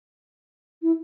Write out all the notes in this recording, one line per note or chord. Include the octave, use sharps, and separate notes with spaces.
E4